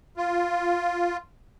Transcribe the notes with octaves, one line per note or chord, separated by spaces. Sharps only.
F4